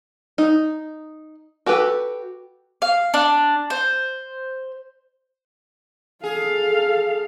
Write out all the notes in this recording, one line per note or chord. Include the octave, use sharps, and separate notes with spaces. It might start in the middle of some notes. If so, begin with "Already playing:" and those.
D#4
F#4 G4 A4 B4
F5
D4
C5
G#4 A4 F5